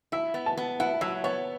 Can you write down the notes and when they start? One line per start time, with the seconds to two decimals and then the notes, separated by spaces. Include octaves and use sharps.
0.12 E4 E5
0.34 B3
0.46 A5
0.57 B3
0.80 E4 F#5
1.01 F#3 E5
1.24 B3 C#5